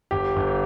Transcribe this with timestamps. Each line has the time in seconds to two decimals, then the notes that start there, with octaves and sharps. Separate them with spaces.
0.11 G1 G4
0.36 G1